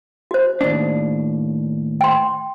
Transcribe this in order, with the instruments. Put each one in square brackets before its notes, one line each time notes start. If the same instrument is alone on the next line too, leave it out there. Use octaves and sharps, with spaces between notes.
[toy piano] F#4 C5
[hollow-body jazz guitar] D#2 A2 D4
[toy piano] G5 C6